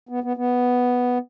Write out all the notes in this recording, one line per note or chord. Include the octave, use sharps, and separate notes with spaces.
B3
B3
B3